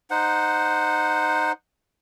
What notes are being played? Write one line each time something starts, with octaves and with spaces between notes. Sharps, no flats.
D#4 C5 F#5